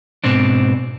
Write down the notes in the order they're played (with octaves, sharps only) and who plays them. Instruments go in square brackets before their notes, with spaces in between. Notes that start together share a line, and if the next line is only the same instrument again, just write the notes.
[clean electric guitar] G#2 B2 C4 D4